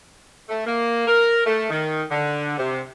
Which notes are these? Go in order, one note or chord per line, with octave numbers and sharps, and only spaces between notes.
A3
A#3
A#4
A3
D#3
D3
C3